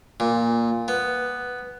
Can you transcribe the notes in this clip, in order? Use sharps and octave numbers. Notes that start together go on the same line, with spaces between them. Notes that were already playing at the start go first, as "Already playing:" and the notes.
A#2
B3